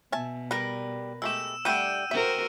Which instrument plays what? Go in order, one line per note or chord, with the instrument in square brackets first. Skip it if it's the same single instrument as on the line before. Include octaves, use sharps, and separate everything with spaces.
[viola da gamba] B2 [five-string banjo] E5 G#5 A5
[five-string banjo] G3 [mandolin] A#4 B4
[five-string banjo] G#3 A3 G4 [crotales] E6 E7
[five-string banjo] G3 A3 D4 [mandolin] F#5 G5 [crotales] E6 D#7
[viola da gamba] F#4 A#4 C5 [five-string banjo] E5